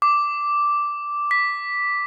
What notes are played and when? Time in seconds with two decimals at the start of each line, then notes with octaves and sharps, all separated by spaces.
0.02 D6
1.31 B6